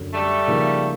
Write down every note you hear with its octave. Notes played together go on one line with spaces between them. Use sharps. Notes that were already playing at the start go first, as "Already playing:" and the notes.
Already playing: F#2 D3 F#3
G3 A3
C#3 F3 A#3 D#4